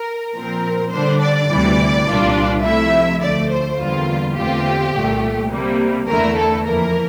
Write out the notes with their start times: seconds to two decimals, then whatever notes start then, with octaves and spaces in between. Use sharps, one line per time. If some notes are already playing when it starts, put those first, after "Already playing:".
Already playing: A#4
0.35 A#2 F3 C4 A#4
0.93 D3 G3 D4 C5
1.21 D5
1.50 D2 C3 E3 G3
2.07 C2 A#2 G3 D4 F4
2.64 C3 F3 A3 E4 E5
3.21 D2 D3 F3 A3 D5
3.50 C5
3.79 E2 D3 G3 A#3 F4
4.36 E2 D3 A3 C4 F4 G4
4.94 C2 A#2 A3
5.51 C3 G3 A#3
6.08 E2 D3 A3 E4 A#4
6.38 A4
6.66 F2 E3 A#3 A#4